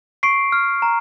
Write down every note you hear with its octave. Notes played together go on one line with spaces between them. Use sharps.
C#6 C7 D7
F6
A#5